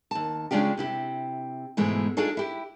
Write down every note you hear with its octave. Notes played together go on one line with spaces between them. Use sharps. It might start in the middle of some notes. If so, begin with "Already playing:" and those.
D#2 A5
C#3 G#3 C#4 D4 F4 G4
C3 E4 G4
G#2 B2 E3 G#3 A3
D4 D#4 F4 G#4 A4 C#5
E4 G4